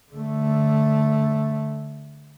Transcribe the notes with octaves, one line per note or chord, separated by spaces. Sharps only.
D3 A3